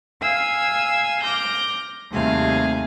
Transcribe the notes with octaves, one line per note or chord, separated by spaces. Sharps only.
F5 G#5 E6 G#6
D6 F6 G6 A#6
D#2 C3 G3 A3 G#4 F5